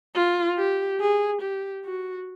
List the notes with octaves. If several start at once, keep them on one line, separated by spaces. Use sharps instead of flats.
F4
G4
G#4
G4
F#4